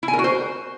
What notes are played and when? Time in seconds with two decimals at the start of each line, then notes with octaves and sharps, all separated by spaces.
0.03 E4
0.08 G#5
0.13 A#4
0.19 F#4
0.24 C5